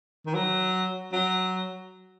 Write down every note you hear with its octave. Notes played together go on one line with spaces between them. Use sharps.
D#3
F#3
F#3